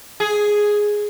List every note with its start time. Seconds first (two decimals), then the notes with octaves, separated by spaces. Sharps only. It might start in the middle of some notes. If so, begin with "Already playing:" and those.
0.20 G#4